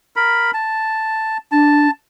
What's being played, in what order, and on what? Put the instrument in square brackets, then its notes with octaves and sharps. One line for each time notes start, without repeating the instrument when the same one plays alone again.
[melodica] A#4 B5
A5
[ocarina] D4 [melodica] A5